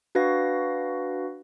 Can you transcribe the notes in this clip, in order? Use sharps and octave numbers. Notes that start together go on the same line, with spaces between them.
D4 F#4 B4 F5 A#6